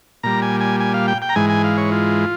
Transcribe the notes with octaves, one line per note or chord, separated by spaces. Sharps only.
A#2 G3 A#5
G#5
G#5
G#5
F5
G5
G5
A#5
G#2 E3 G#3 G#5
G#5
F5
C#5
F4